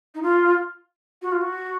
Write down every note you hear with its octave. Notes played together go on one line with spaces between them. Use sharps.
D#4
F4
F#4
F4
F#4